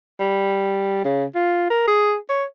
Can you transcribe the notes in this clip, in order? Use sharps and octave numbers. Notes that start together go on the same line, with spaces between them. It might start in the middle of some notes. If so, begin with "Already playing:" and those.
G3
C#3
F4
A#4
G#4
C#5